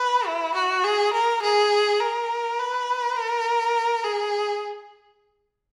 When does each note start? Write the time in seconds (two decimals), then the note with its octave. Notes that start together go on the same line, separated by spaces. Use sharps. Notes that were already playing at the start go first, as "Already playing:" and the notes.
Already playing: B4
0.27 E4
0.55 F#4
0.84 G#4
1.13 A#4
1.42 G#4
2.00 A#4
2.59 B4
3.16 A#4
4.04 G#4